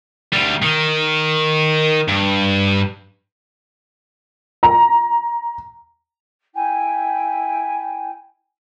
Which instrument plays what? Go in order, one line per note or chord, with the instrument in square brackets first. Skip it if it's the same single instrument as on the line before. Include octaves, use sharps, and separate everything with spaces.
[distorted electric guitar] D2 G3
D#3
G2
[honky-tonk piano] A#5
[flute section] E4 G5 G#5